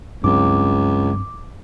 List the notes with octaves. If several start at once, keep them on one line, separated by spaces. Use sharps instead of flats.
C#2 G2 F#3 C4 D6